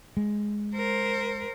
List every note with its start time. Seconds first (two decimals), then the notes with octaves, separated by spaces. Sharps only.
0.17 G#3
0.75 A#4 C5